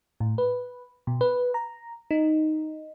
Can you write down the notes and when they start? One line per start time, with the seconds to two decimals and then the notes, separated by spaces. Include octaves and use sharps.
0.20 A2
0.38 B4
1.07 B2
1.21 B4
1.54 A#5
2.11 D#4